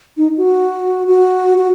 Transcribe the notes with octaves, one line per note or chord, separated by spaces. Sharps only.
D#4
F#4
F#4
F#4